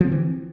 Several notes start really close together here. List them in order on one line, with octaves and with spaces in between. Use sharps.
F3 C4 D3 E3